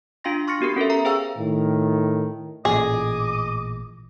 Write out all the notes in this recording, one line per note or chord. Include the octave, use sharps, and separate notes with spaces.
D4 F4 F5 G5 C6 A#6
C6 C#6 F6 A6 A#6 C#7
B3 F#4 G4 A#4 C#7
C#4 A4 A#4 E5
A#4 E5 A#5
G#4 C5 F5 G5 E6
A2 D#3
A1 A#2 G#4 D#5 D6